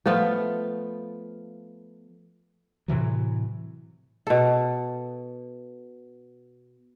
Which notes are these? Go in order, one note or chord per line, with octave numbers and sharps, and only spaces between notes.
F3 A3 B3 F4
A2 C3 E3 F#3
B2 A4